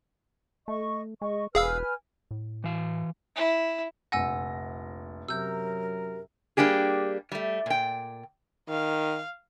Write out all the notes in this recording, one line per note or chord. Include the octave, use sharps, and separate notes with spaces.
A3 D#5 C#6
G#3 D#5 C#6
E1 G#4 B4 F5 G#5 E6 F6
A2
E3 F5
E4
F1 A#1 F#5 G#5 E6 A#6
F#2 C3 F#3 A#4 E6 G6
G3 A#3 D4 G4 G#4
G3 A3
A#2 G5
D#3 F5